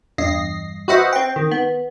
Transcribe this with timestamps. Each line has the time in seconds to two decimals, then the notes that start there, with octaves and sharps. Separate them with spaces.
0.18 E2 G2 D#5 A#6 C7
0.88 F#4 B4 C5 D#5 E5 F#5
1.13 C4 G5
1.36 D#3
1.51 B3